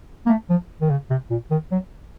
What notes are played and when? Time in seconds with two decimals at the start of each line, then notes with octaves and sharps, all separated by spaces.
0.26 A#3
0.29 A3
0.49 F3
0.81 D#3
0.90 C#3
1.10 C3
1.30 A#2
1.51 D#3
1.71 F#3